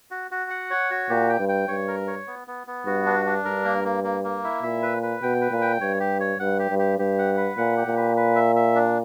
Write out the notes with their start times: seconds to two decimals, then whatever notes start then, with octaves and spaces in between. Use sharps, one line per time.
0.11 F#4
0.31 F#4
0.50 F#5
0.71 C#5
0.90 F#4
1.10 A#2 G4
1.29 G5
1.39 G2
1.49 G5
1.68 G2 C#5
1.88 A#4
2.08 C#5
2.27 B3
2.47 B3
2.67 B3
2.86 G2 F#4
3.06 D4
3.26 D4
3.45 G2 A#4
3.64 A#3
3.84 A#3
4.04 A#3
4.24 A#3
4.44 E4
4.63 A#2 E5
4.82 B4
5.03 B4
5.22 B2 G5
5.41 B4
5.51 A#2
5.62 G5
5.81 G2 C#5
6.00 G4
6.20 C#5
6.39 G2 F#5
6.59 G4
6.69 G2
6.79 G4
6.99 G2 G4
7.18 F#5
7.37 B4
7.57 A#2 F#5
7.77 G4
7.87 A#2
7.97 B4
8.17 B4
8.36 E5
8.56 E5
8.75 D4